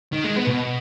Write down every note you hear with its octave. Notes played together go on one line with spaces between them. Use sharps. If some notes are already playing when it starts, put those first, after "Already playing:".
D#3
G#3
B3
B2